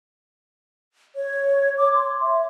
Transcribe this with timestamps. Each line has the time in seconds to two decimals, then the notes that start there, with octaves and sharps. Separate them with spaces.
1.16 C#5
1.78 D6
1.94 C6
2.21 E5